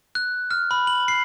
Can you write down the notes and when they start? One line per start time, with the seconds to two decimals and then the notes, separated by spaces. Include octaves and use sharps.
0.15 F#6
0.51 F6
0.71 B5
0.87 F#7
1.08 C7